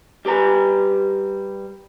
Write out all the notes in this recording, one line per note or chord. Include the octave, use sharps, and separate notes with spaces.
G3 G4 B4 A#5